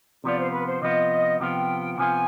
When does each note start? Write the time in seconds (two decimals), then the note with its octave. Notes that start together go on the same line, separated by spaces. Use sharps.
0.24 C3 F3 B3 F4 D5
0.38 C5
0.51 B4
0.65 C5
0.82 C3 F3 B3 F4 D#5
1.40 C3 F3 B3 F4 G5
1.93 G5
1.98 C3 F3 B3 F4 G#5